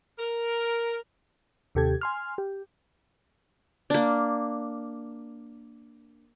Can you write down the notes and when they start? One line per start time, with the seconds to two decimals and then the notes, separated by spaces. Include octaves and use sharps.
0.18 A#4
1.75 D#2 C3 G4 A4 G#6
2.01 G#5 C6 F6
2.38 G4
3.90 A#3 D4